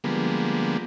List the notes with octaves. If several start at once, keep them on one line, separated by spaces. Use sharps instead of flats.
D3 F3 G3 G#3 A#3 B3